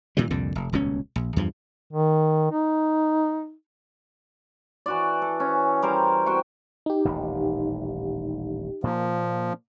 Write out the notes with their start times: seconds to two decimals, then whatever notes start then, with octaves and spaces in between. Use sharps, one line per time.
0.17 A#2 D#3 E3 G3
0.30 C2 F2 A#2 D3
0.55 F1
0.73 D#1 C#2 B2 C#4
1.16 A#1
1.36 E2 G2 F3
1.93 D#3
2.51 D#4
4.86 E3 F#4 D5
5.22 A4
5.40 C#4
5.82 G3 A#4 C5
6.26 C4 F#4 G5 C#6
6.86 D#4 G4
7.05 D#1 A1
8.84 A#2 F3 A#3